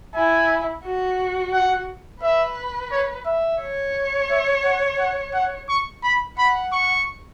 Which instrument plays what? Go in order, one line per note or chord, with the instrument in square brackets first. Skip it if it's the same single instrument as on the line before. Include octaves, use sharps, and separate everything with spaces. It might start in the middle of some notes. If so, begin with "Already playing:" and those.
[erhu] E4 [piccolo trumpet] G#5
[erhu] F#4
[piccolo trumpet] F#5
[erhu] B4 [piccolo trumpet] E5
[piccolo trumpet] C#5
E5
[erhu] C#5
[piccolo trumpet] E5
F#5
F#5
F#5
C#6
B5
[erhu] F#5 [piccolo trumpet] B5
[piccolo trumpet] C#6